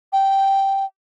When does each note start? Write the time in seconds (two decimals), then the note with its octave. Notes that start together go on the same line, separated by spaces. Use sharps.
0.13 G5